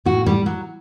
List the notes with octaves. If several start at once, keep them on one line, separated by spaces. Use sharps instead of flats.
A2 F#4
G3
F#3